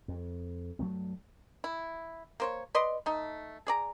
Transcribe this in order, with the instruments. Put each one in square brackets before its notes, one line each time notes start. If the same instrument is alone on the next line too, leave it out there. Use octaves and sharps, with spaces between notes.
[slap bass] F2
G2 F#3 A3 B3
[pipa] E4
A#3 C5 C#5
B4 D5 D#5 C6
A3 D#4
G#4 D5 A#5